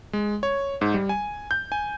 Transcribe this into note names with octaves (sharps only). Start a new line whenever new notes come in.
G#3
C#5
G#2
G3
G#5
G6
G#5